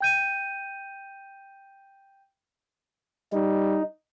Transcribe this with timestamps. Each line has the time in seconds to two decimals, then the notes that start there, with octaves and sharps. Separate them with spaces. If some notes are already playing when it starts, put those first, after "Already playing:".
0.01 G5 G6 D#7
3.33 G3 D#4